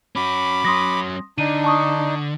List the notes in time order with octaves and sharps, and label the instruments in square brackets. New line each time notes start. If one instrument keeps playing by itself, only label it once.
[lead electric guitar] C#4 F#4 [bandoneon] B5 D6
[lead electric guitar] F#3 C#4 [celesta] C6 D#6 A#6
[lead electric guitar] D3 [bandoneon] D4 D#4 [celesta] D#7
[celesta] A5 C#6 D#6